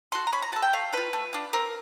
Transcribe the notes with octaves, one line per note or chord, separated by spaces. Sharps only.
F#4 A4 C6
A#5
C#4 B5
A#5
F#4 A4 A5
G5
A3 F5
D4 F4 B4
A3
D4 F4
C4 A#4